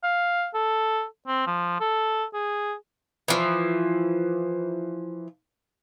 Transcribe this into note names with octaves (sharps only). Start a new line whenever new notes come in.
F5
A4
C4
F3
A4
G#4
E3 F3